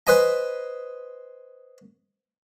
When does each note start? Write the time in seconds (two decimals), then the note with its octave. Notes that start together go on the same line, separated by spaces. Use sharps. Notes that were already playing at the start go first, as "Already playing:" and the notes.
0.07 B4 C5 D#5 G#5 A#5